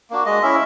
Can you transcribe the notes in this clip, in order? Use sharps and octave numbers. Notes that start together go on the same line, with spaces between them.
A#3 D4 F#4
G#3 D#5
C#4 E4 E5